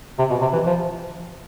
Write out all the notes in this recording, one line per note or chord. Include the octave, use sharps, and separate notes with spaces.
C3
B2
C3
E3
F3